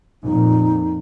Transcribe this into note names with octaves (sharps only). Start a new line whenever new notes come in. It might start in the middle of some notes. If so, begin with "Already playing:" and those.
F2 A#2 D#4